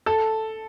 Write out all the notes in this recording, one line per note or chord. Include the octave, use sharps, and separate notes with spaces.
A4